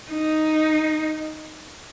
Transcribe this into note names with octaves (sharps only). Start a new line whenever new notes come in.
D#4